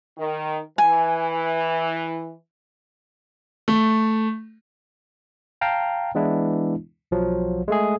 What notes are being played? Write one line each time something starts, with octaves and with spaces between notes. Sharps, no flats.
D#3
E3 G#5
A3
F5 G5 A5 A#5
E3 G#3 B3 D4 E4
B1 F3 F#3
G#3 A3 G#4